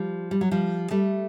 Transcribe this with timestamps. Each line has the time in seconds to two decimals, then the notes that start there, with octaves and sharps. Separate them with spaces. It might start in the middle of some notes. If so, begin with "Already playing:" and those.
Already playing: F3 G3
0.31 G3
0.41 F#3
0.51 F3 G3
0.91 G3 A3